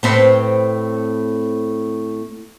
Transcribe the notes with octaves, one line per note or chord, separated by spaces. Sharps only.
A2 C4 B4